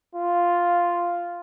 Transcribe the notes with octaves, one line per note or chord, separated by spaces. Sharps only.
F4